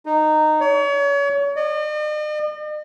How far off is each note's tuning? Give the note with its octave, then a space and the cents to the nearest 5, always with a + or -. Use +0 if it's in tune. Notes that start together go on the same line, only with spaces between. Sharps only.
D#4 -15
C#5 +35
D#5 -45